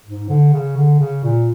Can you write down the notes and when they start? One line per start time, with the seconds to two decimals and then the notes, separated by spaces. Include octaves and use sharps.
0.06 G#2
0.29 D3
0.53 C#3
0.76 D3
1.00 C#3
1.24 A#2